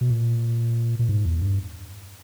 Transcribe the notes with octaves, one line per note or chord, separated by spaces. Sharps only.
B2
A#2
A#2
G#2
E2
G2